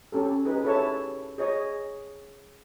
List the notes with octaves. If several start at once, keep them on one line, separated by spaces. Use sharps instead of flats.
C#4 G4 A4
D#4 G#4 B4
E4 G4 A4 C#5 E5 A5
G#4 C#5 D#5